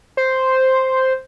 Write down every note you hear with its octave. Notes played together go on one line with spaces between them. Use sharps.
C5